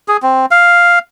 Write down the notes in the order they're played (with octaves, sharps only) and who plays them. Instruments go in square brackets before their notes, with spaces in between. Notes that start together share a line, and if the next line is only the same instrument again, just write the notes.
[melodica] G#4
C4
F5